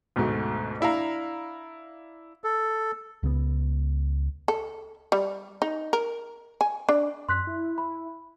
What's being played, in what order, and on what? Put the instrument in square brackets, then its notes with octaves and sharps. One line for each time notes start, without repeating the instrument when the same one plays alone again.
[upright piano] D2 G#2 B2 A3
D4 E4 F5 A#5
[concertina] A4
[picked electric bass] C#2 C#3 G#3 B3
[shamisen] A4
G3
D#4
A#4
G#5
D4
[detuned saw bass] F#2 [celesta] C6 F#6 B6
[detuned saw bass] E4
[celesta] B5